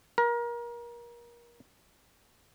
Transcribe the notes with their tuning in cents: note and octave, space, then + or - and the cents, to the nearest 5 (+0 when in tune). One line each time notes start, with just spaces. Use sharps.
A#4 +30